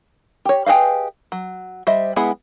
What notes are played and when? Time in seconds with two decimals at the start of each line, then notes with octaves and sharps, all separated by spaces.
0.45 G4 C#5
0.66 G4 G#4 B4 D#5 F5
1.32 F#3
1.87 G3 C5 D#5 E5
2.16 G#3 B3 E4 G#4 F#5